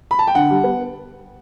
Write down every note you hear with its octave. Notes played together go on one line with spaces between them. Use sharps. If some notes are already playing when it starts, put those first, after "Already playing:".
B5
A5
G5
D3 F#5
G3
B3